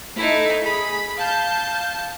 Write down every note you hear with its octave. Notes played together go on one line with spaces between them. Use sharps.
A3 D#4 E4 A4
G#4 B5
F5 A5 G6